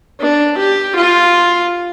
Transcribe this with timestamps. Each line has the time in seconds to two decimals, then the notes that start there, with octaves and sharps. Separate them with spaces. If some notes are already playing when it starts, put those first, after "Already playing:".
0.20 D4
0.57 G4
0.95 F4